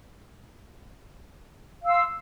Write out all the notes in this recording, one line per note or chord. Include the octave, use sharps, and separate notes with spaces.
F5 C6 E6